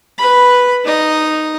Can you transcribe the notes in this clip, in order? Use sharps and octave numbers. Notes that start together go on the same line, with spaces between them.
B4 B5
D#4 D#5